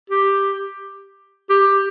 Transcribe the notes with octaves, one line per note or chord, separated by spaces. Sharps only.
G4
G4